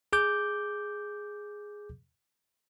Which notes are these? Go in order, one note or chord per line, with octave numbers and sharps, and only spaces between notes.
G#4 D6 G6